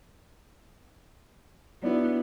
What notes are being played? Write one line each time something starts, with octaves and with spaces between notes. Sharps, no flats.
F#3 B3 D4 E4